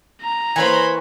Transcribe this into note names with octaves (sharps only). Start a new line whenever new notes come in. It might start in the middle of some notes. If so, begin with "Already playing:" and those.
A#5
E3 A#3 C5 C#5 G#5 B5